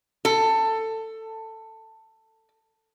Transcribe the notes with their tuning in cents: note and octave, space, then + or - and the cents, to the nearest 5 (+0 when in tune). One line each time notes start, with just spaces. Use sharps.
A4 +15